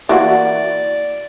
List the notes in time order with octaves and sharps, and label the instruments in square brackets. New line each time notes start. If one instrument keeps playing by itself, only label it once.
[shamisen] E3 A#3 F#4 [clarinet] D5